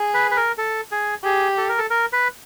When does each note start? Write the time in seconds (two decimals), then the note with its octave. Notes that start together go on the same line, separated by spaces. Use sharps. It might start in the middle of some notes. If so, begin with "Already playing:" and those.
Already playing: G#4
0.14 B4
0.31 B4
0.37 A#4
0.58 A4
0.92 G#4
1.24 G4 G#4
1.57 A4
1.69 A#4
1.79 A4
1.90 A#4
2.13 B4